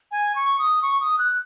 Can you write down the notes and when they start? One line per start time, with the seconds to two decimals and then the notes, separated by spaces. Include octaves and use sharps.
0.11 G#5
0.35 C#6
0.59 D#6
0.82 C#6
1.01 D#6
1.19 F#6